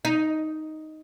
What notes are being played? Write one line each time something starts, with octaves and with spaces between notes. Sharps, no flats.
D#4